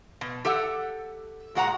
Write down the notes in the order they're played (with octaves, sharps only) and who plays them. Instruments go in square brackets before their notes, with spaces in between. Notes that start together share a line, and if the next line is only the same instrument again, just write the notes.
[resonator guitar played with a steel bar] B2
G4 A4 E5 F#5
A#2 G#3 F#4 F#5 A5 A#5